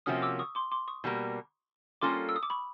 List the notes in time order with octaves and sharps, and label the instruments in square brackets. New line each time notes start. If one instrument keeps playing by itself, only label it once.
[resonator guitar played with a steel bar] C3 F3 A#3 C#4 F#4 [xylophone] D#6 F6
[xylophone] D6 E6
C#6 D#6
C6 D6
C6 D6
C#6 D#6
[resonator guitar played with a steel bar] B2 G3 A#3
[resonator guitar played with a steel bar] G3 A#3 C#4 F4 A4 [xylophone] C6 D6
[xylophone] E6
D#6
D6
B5 C#6